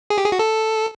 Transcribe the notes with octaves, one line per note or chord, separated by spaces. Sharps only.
G#4
G4
G#4
F#4
A4